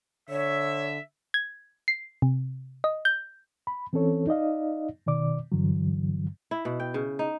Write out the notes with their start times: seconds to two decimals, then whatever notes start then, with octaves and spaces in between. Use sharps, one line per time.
0.29 D3 C#5 E5
1.34 G#6
1.88 C7
2.22 C3
2.84 D#5
3.05 G6
3.67 B5
3.93 E3 C4 C#4 A4 C#5
4.27 D#4 D5 D#5 F5
5.06 B2 D#3 D5 D6
5.52 G2 D3 E3 F#3
6.51 E4
6.65 B2
6.80 G5
6.94 C#3
7.19 D#4